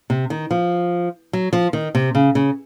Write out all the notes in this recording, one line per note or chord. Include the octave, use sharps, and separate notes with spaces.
C3
D#3
F3
F#3
F3
D#3
C3
C#3
C#3